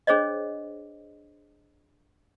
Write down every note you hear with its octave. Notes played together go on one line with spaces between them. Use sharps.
D4 G#4 C5 C#5 D#5